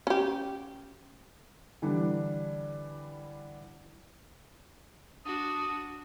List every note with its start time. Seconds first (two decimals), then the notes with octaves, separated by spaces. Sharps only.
0.07 C#4 G4
1.82 D3 E3 G3 D4
5.26 D4 F#4 D#6